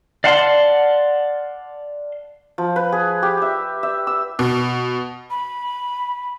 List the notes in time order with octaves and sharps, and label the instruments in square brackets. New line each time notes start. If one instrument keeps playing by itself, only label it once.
[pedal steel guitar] D5 F5 F#5 A5 C6
[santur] F3
B4
G#4
G4
E5
E5
E6
[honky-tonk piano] B2
[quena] B5